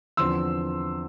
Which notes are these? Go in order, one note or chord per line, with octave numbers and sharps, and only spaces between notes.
E2 D3 F3 C4 C6 E6